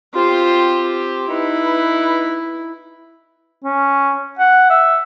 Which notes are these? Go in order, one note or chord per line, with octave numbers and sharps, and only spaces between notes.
C4 F4 G4 C5
D#4 E4 B4
C#4
F#5
E5